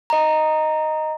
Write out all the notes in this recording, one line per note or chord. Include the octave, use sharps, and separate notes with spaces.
D#5 A#5